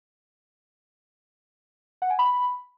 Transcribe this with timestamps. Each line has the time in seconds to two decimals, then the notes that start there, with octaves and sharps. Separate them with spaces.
2.02 F#5
2.10 G#5
2.19 B5